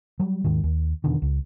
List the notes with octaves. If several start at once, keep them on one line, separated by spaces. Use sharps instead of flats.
F#3 G3
D#2 G#2 D#3
D#2
E2 B2 D3 D#3
C#2